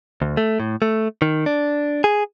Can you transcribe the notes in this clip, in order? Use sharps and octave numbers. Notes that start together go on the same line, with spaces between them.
D2
A3
A2
A3
D#3
D4
G#4